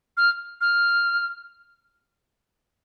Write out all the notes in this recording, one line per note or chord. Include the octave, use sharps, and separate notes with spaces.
F6
F6